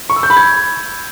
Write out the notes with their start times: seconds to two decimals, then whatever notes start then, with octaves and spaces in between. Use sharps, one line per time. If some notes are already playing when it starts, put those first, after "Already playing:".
0.10 C#6
0.16 E6
0.23 G6
0.30 B5
0.37 G#6